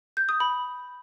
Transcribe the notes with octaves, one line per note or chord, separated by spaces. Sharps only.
G6
D#6
B5